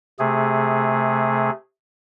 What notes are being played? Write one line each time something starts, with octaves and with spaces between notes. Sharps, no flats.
C3 A3 G#4